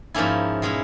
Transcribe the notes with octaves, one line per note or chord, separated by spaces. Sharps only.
G#2 F3 A#3 C#4 E4
B2 G#3 C#4 E4